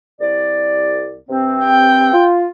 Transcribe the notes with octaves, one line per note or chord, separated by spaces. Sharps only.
C2 D5
G2 C3 C4
G5
F4